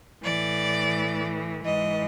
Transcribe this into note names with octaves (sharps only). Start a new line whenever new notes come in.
A2 E3 D5
G#2 E3 D#5